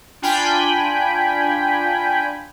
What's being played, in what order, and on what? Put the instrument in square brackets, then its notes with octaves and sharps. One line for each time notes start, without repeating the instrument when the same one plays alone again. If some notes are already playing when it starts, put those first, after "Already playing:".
[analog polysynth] D4 F4 G5 G#5 B5